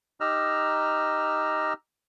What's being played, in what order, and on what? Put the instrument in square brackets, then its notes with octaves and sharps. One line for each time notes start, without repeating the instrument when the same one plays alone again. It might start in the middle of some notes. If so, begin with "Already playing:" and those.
[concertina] D#4 G4 D#5 A#5 E6 F6